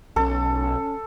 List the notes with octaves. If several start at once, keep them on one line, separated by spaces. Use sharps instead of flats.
B1 C#4 A4